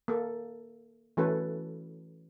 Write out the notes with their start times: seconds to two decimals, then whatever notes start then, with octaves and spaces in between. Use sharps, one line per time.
0.08 A#3 A4
1.17 E3 A3 C#4 F#4 A4 B4